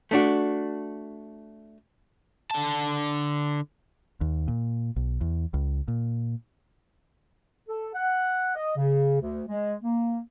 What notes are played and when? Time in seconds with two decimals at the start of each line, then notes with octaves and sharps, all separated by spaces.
0.11 A3 D4 F#4
2.51 D3 A5
4.21 D#2
4.48 A#2
4.96 B1
5.21 E2
5.54 C#2
5.88 A#2
7.68 A4
7.94 F#5
8.55 D#5
8.76 C#3
9.20 D2
9.48 G#3
9.83 A#3